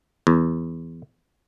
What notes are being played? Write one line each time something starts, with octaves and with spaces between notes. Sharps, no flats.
E2